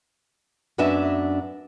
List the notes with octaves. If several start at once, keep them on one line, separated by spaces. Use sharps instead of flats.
F#2 B3 D4 F#4 E5 G#5